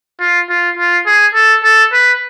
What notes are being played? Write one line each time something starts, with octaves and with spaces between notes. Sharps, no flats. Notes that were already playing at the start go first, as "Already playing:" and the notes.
F4
F4
F4
G#4
A4
A4
B4